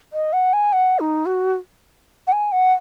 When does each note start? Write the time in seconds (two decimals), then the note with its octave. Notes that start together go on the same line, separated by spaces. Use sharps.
0.13 D#5
0.33 F#5
0.53 G#5
0.73 F#5
0.99 D#4
1.26 F#4
2.27 F#5
2.32 G#5
2.52 F#5